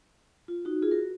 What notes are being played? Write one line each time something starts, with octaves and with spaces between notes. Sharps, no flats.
F4
D#4 F#4
F4 G#4
F#4 A#4